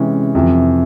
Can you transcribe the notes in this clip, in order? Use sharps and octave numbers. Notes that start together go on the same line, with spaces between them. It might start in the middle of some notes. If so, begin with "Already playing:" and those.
Already playing: C3 E3 G#3 C#4
F2 C3 E3